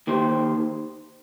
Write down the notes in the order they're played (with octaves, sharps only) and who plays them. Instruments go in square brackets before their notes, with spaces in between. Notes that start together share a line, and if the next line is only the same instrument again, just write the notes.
[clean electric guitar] D#3 A#3 G4 C5